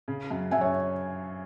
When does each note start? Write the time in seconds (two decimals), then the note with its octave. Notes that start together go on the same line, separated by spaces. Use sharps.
0.08 C#3
0.31 F#2
0.51 F#2 E5 G#5
0.61 C#5